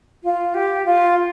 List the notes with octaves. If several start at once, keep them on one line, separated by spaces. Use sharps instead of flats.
F4
G4
F4